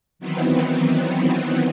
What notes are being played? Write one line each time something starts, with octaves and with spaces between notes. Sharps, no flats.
D#3 E3 F#3 B3 C4